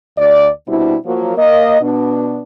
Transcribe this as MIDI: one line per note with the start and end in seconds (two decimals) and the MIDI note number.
0.18 0.48 38
0.18 0.48 74
0.68 0.96 47
0.68 0.96 55
0.68 0.96 60
0.68 0.96 62
0.68 0.96 64
1.06 1.34 53
1.06 1.34 54
1.06 1.34 58
1.37 1.78 58
1.37 1.78 75
1.81 2.42 47
1.81 2.42 59
1.81 2.42 62